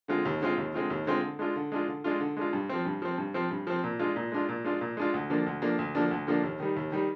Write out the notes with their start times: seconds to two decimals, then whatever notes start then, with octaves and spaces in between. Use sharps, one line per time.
0.08 D3 G#3 C4 F4
0.25 D#2
0.41 D3 G#3 C4 F4
0.57 D#2
0.74 D3 G#3 C4 F4
0.90 D#2
1.06 D3 G#3 C4 F4
1.23 D3
1.39 G#3 D4 F4
1.56 D3
1.72 G#3 D4 F4
1.88 D3
2.04 G#3 D4 F4
2.20 D3
2.37 G#3 D4 F4
2.53 G2
2.69 F3 C4
2.86 G2
3.02 F3 C4
3.18 G2
3.34 F3 C4
3.51 G2
3.67 F3 C4
3.83 A#2
3.99 G#3 D4 F4
4.16 A#2
4.32 G#3 D4 F4
4.48 A#2
4.64 G#3 D4 F4
4.81 A#2
4.97 G#3 D4 F4
5.14 D2
5.30 D3 F3 A#3 D4
5.46 D2
5.62 D3 F3 A#3 D4
5.78 D2
5.95 D3 F3 A#3 D4
6.11 D2
6.27 D3 F3 A#3 D4
6.43 D#2
6.60 D#3 G3
6.76 D#2
6.92 D#3 G3